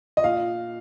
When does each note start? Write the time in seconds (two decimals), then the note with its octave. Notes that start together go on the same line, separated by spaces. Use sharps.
0.17 D#5
0.24 A#2 F5